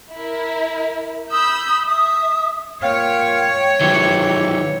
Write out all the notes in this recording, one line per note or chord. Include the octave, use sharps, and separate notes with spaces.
E4 A#4
B5 D#6 E6 G6
E5 D#6
A#2 C#5 F5 G5
G#2 C3 D#3 E3 F#3